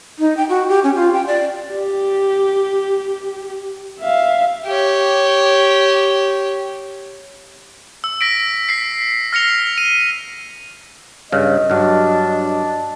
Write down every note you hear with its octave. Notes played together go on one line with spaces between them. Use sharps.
D#4
G5
F#4
G4
C#4
F4
G5
D5
G4
E5 F5
G4 C#5
E6
A#6 B6 D7
B6 C7
F6 A#6 C#7 F7
D#7
G2 C#3 D#5
G2 F#3 D4